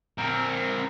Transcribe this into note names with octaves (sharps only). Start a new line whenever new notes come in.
C4 A#4